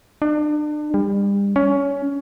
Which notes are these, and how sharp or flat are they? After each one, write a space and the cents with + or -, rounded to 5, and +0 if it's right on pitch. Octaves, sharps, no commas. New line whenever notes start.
D4 +35
G3 +35
C#4 +20